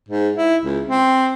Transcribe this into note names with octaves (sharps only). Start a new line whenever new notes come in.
G#2
E4
C#2
C4